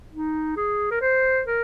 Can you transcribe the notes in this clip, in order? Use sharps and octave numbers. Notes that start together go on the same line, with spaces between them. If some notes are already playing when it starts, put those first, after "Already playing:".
D#4
G#4
A#4
C5
A#4